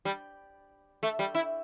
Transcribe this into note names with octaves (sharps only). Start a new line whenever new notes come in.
G3
A3
G3
E4